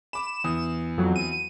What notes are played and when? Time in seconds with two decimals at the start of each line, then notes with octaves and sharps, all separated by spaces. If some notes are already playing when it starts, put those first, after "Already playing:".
0.13 B5 D6 E7
0.44 E2 D#6
0.98 F2 F#3
1.16 D#7